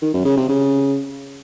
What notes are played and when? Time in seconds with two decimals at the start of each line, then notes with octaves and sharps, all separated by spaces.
0.02 D#3
0.13 F#2
0.25 C#3
0.37 C3
0.49 C#3